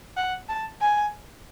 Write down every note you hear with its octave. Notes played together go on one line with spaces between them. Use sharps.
F#5
A5
G#5